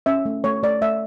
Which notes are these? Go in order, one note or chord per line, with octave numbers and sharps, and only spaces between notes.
C#4 E5
A3
A3 C#5
A3 D5
A3 E5